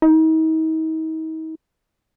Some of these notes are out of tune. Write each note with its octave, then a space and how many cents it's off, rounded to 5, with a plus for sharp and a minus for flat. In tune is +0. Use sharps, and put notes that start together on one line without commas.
D#4 +40